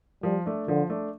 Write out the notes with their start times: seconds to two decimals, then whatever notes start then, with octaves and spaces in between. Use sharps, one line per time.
0.23 F3 G3
0.46 A3 D4
0.68 D3 F3
0.90 A3 D4